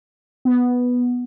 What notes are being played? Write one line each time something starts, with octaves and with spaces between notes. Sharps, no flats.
B3